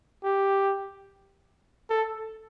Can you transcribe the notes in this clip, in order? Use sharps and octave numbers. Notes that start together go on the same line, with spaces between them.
G4
A4